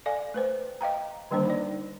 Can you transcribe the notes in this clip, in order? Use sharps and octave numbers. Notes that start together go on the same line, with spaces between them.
A4 D5 F5 G#5
A3 B4 C5
D#5 F5 G5 A#5
D3 D#3 G3 A#3 D4 C5
D#4 D5